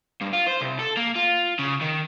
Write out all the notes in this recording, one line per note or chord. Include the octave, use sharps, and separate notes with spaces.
G2
F4
C5
C2
A4
A#3
F4
C#3
D#3